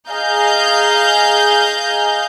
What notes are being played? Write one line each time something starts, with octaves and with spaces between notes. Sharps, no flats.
G#4 D#5 F5 A#5 G6